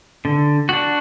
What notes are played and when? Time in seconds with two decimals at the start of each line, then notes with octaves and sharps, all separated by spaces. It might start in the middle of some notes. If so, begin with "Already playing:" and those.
0.25 D3
0.69 D4 F#4